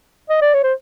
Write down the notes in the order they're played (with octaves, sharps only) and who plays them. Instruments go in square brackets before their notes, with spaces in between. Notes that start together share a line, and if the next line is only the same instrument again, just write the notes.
[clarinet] D#5
D5
C#5
C5